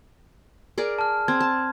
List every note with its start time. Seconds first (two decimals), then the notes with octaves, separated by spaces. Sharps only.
0.78 G#4 A#4 D5
0.99 A5 F6
1.28 C4 G#6
1.40 A5